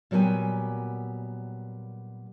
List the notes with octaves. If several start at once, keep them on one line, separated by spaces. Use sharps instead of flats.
A#2 F#3 G3 B3 G5 G#5